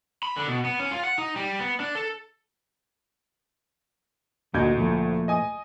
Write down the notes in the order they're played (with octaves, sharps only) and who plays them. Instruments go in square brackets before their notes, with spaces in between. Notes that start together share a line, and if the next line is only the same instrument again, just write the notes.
[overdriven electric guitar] B5
D3
B2
B3
C#4
F4
F#5
D#4
G3
B3
D4
A4
[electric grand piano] D2 G6 G#6 [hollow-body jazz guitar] A#2 F#4 D#5
[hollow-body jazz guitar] A#2 F3 A3
[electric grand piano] D#5 G#5 D#6